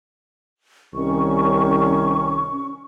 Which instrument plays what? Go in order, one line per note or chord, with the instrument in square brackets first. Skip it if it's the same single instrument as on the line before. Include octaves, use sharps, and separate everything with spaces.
[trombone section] C2 D#3 [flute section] C#4 C#6